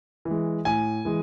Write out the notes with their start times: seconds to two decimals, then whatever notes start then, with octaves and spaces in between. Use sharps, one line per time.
0.25 E3
0.31 G#3
0.65 A2 G#5
1.05 E3 G#3